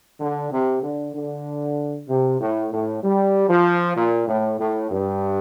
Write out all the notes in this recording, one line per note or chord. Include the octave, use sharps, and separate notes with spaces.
D3
C3
D3
D3
C3
A2
A2
G3
F3
A#2
A2
A2
G2